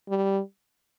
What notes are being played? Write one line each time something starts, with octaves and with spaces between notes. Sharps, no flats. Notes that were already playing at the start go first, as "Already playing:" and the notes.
G3